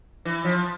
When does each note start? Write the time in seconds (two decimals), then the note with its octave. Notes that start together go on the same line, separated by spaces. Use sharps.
0.25 E3
0.45 F3